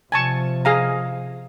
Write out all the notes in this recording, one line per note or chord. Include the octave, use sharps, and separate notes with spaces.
C3 F3 G#5 A5 C#6
G#4 F5 A#5